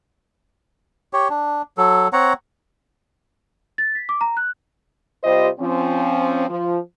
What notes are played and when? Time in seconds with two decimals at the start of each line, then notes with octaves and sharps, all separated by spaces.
1.13 G4 C#5
1.30 D4
1.78 F#3 A4
2.13 C4 C#5 F#5 A#5
3.78 A6
3.95 B6
4.09 D6
4.21 A#5
4.37 F#6
5.24 C3 G3 F4 G4 C5 D#5
5.60 F3 C4 C#4
6.48 F3